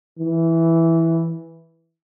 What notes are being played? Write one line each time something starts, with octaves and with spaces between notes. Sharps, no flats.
E3